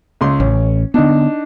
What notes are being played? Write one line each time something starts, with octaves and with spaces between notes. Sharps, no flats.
C#2 C6
A1 C#4
D3 B3 D4 D#4